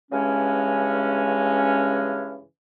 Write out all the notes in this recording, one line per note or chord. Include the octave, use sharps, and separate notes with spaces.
G2 C#3 E3 G#3 C#4